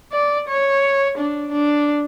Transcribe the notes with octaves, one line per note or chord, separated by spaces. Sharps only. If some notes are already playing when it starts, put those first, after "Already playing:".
D5
C#5
D4
D4